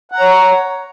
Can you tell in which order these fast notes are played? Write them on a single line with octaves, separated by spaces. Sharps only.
F#5 A#5 C#5